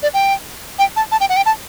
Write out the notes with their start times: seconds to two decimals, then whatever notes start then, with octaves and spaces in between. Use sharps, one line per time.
0.03 D5
0.14 G5
0.79 G5
0.96 A5
1.12 A5
1.20 G5
1.29 F#5
1.37 G5
1.46 A5